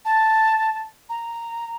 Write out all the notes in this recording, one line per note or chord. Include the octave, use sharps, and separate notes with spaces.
A5
A#5